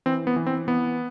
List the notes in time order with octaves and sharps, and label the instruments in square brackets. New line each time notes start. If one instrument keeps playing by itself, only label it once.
[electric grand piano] E3 C4
B3
E3
C4
E3 B3